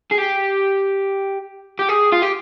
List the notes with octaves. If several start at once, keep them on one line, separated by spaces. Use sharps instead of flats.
G#4
G4
G4
G#4
F4
G4